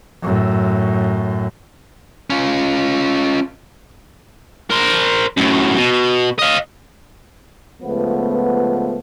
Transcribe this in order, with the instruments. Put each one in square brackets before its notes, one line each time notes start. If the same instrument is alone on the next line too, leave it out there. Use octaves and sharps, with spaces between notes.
[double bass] F#2 A2
[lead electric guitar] C#4 F4
[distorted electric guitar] A#4 C5
F#2 A2
B2
D#5 F5
[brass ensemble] C#2 F3 A3 B3